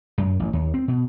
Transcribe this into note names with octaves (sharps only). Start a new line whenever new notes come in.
F#2
A1
D#2
C4
B2